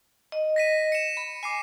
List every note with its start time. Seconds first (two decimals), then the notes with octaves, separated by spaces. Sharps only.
0.32 D#5
0.56 A#6 B6 D#7
0.92 C#7 E7
1.17 B5
1.43 G#5 D6 C7 D#7